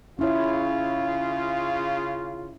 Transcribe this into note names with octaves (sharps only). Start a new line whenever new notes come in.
C#3 C#4 E4 F4 C#5